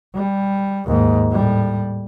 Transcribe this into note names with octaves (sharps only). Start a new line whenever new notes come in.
G3
D#2 G#2
A2 G3